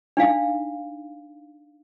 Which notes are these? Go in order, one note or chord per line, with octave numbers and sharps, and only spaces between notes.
D4 D#4 F5